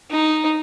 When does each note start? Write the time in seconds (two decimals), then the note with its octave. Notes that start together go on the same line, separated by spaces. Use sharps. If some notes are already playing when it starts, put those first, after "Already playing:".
0.10 D#4